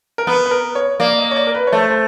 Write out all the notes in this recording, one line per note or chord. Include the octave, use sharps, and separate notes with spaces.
A#4
B3 B4
B4
A#4
C#5
A#3 D5
D#5
C#5
D5
A#4
B4
C#5
A3 C5
C5